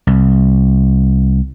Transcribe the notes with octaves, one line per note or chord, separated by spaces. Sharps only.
C2